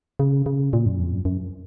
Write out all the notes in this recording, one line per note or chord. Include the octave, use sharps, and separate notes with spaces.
C#3
C#3
A#2
F#2
F2
F#2
F#2